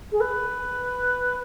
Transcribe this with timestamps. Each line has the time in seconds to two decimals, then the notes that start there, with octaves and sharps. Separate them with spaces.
0.12 G#4
0.20 B4